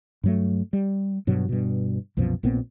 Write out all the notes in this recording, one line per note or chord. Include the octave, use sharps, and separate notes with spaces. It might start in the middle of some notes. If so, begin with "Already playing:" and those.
G2 F#3 A3
G3
G2 B2 F#3
G2 B2
C2 F#2 B2 F3
A#1 A#2 B3 C4